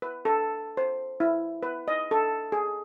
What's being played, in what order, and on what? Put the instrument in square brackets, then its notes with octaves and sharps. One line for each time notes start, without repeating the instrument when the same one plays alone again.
[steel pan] B4
A4
C5
E4
B4
D#5
A4
G#4